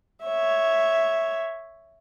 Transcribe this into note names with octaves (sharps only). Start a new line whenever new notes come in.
C#5 E5